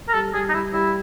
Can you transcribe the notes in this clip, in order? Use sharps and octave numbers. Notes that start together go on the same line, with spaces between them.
A#4
G3 A4
G3 G#4
D#4
G3 E4
G3 E4